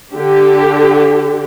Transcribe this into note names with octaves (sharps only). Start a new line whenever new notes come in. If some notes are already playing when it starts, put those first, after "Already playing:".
D3 G4